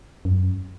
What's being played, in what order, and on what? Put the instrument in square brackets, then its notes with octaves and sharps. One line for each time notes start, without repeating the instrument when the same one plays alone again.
[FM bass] F#2